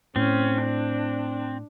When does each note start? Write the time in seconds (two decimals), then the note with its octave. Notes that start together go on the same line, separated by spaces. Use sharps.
0.16 A2 C4 C#4
0.63 D4